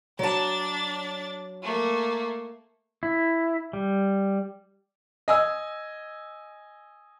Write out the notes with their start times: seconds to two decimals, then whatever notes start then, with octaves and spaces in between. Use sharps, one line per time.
0.19 F#3 D4 A5 A6
1.62 A3 A#3
3.03 E4
3.73 G3
5.28 D#5 G#5 E6